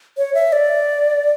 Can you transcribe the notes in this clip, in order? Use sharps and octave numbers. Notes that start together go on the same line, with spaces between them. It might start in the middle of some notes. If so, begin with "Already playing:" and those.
C#5
E5
D5